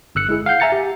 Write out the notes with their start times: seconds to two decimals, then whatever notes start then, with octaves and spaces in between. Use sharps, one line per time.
0.15 G1 E6 F#6 C#7
0.29 G#3 E4 G#4
0.46 F5 F#5 G6 C7
0.60 E5 G#5 A#5 A6 C#7
0.72 G4